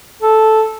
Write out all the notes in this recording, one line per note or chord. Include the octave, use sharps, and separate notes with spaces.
A4